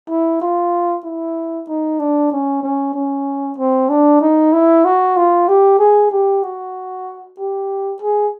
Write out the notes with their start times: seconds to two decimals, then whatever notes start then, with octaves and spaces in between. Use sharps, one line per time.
0.09 E4
0.42 F4
1.05 E4
1.68 D#4
1.99 D4
2.32 C#4
2.63 C#4
2.94 C#4
3.58 C4
3.89 D4
4.22 D#4
4.53 E4
4.85 F#4
5.17 F4
5.48 G4
5.79 G#4
6.11 G4
6.43 F#4
7.39 G4
8.02 G#4